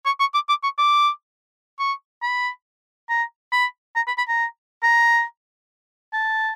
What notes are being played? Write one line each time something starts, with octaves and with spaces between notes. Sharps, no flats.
C#6
C#6
D6
D6
C#6
D6
C#6
B5
A#5
B5
A#5
B5
B5
A#5
A#5
A5